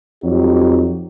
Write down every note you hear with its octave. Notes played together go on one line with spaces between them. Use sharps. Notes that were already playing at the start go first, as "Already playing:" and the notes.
F2 F#3 D#4 G4